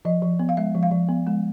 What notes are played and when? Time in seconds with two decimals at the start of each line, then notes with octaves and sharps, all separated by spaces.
0.05 F3 D#5
0.22 F3
0.39 B3
0.49 F5
0.57 G#3 E5
0.75 F3
0.83 F5
0.91 F3
1.08 B3
1.27 G#3